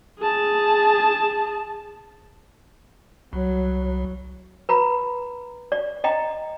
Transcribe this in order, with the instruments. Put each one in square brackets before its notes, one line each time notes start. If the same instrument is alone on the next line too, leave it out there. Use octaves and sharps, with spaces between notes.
[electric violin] G#4 A5
[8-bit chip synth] C2 [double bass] F#3
[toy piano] B4 A#5 B5
D5
D#5 G5 A#5